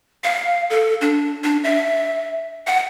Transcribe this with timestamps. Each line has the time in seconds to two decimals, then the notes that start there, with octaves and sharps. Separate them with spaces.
0.24 F5
0.70 A4
1.01 D4
1.44 D4
1.64 E5
2.67 F#5